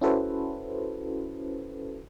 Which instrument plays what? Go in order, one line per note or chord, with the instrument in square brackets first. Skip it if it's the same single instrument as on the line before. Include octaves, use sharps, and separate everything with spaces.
[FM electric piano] C#4 E4 F#4 A4 B4 C5